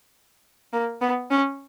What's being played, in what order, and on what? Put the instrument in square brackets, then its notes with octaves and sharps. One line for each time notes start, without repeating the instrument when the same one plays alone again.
[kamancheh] A#3
B3
C#4